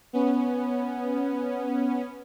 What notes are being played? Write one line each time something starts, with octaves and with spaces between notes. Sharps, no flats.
B3 C#4